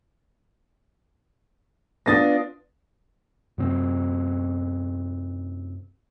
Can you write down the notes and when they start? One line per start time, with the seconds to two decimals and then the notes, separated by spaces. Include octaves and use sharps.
2.06 B3 D4 F4 D#6 A6 A#6
3.58 F#2 C3 C4